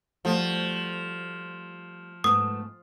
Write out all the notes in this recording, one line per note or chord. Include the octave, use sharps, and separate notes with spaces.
F3 G3 A3 F#4
G#2 A3 B3 D#6